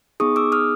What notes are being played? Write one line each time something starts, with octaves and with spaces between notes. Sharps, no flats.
B3 D#4 G#4 C#6 D#6
D6 E6
D#6 F6